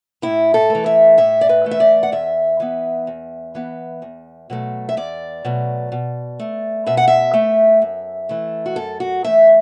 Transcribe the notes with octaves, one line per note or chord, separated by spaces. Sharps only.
A2 E4
A4
E3 A3
E5
A2 E5
D5
B4
E3 A3
E5
D5
F#5
E2 E5
E3 B3
E2
E3 B3
E2
B2 F#3 A3
E5
E2 D5
B2 F#3 A3
B2
A3
B2 E5
F#5
E5
A3
F#2
E3 A3
F#4
F#2 A4
F#4
E3 A3 E5